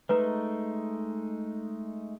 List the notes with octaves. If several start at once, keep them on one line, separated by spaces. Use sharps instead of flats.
G#3 A3 D#4 B4 A#5